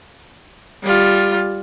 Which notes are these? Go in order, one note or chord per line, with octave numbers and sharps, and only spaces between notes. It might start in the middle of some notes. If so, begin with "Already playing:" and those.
G3 F4